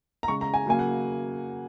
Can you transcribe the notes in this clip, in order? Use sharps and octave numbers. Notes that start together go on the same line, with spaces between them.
A#5
C#3 G#3 C#6
A#5
G#5
C#3 F#3 A#3 G#5
F#5